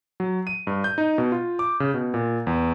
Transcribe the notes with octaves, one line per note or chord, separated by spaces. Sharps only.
F#3
D#7
G2
G6
D#4
B2
F4
D6
C#3
B2
A#2
E2